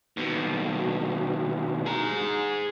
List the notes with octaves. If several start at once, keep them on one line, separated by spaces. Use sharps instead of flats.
D#2 B2
G#4 A#5